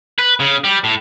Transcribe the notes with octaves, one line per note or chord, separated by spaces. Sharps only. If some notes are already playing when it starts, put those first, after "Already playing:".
B4
C#3
G3
A2